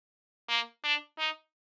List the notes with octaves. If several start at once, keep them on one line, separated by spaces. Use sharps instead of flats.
A#3
D4
D#4